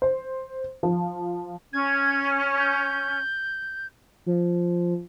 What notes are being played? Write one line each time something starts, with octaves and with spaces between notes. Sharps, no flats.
C5
F3
C#4 G#6
G6
F3